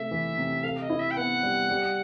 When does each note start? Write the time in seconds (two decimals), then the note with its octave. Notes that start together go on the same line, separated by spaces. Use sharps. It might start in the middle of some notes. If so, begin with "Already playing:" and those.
Already playing: C3 A3 E5
0.11 E3
0.38 C3
0.64 A4 F5
0.82 D#5
0.90 E4
0.99 E5
1.11 G5
1.17 B3 F#5
1.43 G3
1.69 G3